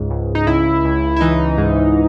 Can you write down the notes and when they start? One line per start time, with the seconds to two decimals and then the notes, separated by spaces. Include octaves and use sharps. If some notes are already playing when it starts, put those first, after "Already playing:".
Already playing: C#2 G#2
0.10 C#2
0.35 D#4
0.47 C#2 E4
0.85 C#2
1.16 E4
1.21 E3 D#4
1.58 G#2